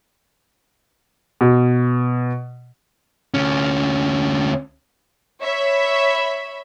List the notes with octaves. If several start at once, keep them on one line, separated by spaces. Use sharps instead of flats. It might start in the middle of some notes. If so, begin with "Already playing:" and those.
B2
D2 C#4
C#5 E5 B5